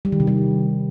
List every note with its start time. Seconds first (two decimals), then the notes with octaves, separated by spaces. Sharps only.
0.05 G3
0.12 D#3
0.20 C3
0.27 G3